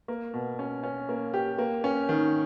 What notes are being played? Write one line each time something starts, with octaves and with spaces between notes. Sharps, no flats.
A#3
B2
C#4
C#4
A#3
G4
A#3
C#4
D#3